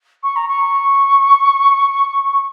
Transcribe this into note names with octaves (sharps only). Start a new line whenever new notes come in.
C#6
A#5
C#6